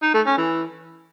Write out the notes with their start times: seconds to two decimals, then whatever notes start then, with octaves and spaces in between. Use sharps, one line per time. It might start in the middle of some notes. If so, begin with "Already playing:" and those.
0.02 D#4
0.14 A3
0.26 C#4
0.38 E3